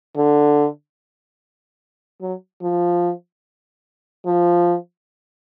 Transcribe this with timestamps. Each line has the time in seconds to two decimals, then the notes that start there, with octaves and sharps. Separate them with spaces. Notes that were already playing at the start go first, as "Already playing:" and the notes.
0.17 D3
2.21 F#3
2.62 F3
4.25 F3